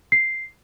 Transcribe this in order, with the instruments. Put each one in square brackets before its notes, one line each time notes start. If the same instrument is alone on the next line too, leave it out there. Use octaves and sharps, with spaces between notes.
[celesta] C7